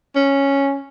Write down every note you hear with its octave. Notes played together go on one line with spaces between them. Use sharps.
C#4